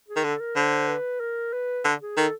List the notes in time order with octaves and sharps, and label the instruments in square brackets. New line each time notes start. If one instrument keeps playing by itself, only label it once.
[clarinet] G#4
[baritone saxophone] D#3
[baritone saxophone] D3 [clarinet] A4
[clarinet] A#4
[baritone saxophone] D3 [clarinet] C5
[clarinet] B4
A#4
B4
[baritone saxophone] D3
[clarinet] G#4
[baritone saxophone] D#3 [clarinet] A4